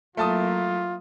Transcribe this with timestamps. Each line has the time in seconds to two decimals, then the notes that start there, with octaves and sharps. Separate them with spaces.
0.17 F#3 A3 A#3 E4 F4 A5 D#6